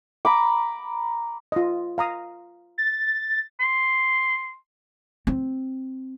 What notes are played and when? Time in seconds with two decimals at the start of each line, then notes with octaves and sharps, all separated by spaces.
0.25 A#5 B5 D6
1.52 F4 D#5
1.98 F5 A#5 D#6
2.78 A6
3.60 C6
5.27 C4